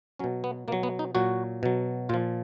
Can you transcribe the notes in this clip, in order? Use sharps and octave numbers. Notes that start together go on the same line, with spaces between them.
B2 F#3 C#4
B3
B2 F#3 A#3
B3
D#4
A#2 F#3 F#4
B2 F#3
A#2 F3 F4